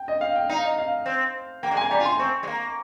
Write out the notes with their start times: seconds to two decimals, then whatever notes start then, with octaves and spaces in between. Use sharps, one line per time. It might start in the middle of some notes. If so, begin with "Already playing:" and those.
Already playing: G5
0.08 D#5
0.21 F5
0.36 G5
0.49 D#4 F5
0.64 D#5
0.78 F5
1.06 C4
1.63 A#3 G5
1.71 G#3
1.77 A#3 G#5
1.91 G3 A#5
2.00 F4
2.05 C6
2.19 C4 C#6
2.43 G#3
2.47 A#3